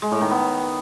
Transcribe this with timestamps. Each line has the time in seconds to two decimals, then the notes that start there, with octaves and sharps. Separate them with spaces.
0.02 G#3
0.12 A2
0.21 D#3
0.30 B3